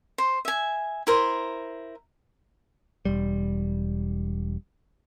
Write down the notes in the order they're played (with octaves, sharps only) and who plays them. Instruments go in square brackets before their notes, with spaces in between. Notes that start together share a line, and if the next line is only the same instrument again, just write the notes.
[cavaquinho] C5
E5 G#5
E4 A#4 C5
[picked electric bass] E1 G3